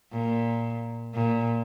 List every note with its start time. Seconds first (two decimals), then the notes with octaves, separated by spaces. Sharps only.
0.12 A#2
1.14 A#2